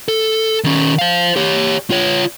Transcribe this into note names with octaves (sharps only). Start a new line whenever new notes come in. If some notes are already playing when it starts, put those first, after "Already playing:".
A4
D#3 C#4
C5 F5
G4 C#5
F4 C#5